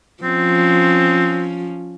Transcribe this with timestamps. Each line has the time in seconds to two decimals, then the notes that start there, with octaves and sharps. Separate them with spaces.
0.23 F3 C4 C#4